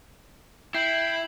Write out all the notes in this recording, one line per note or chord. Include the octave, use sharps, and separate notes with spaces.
E4 G5 C7 F#7